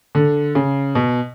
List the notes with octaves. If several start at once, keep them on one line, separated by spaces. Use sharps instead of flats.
D3
C#3
B2